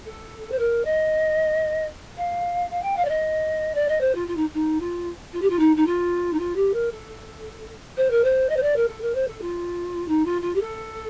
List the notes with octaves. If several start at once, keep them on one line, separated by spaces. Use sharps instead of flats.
A4
C5
A#4
D#5
F5
F5
G5
F5
D5
D#5
D5
D#5
C5
F4
F4
D#4
D#4
F4
F4
G4
F4
D#4
D#4
F4
D#4
F4
G4
A#4
A4
C5
A#4
C5
D#5
C5
D5
A#4
A4
A#4
C5
A4
F4
D#4
F4
F4
G4
A4